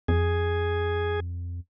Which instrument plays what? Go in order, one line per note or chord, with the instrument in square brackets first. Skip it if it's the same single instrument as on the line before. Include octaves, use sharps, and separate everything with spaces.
[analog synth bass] F2 [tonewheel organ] G#4